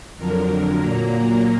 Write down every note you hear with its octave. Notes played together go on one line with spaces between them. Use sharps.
F2 D3 F#3 A#4
A#2 F#3 A#3
A#4